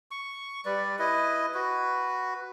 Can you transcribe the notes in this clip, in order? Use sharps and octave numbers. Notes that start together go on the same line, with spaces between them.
C#6
G3 B4 D5
E4 B4 D#5
F#4 B4